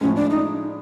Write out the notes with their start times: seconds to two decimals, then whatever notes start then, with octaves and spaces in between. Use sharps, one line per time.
0.01 A2 F3 G#3 C#4
0.16 D4
0.30 D#4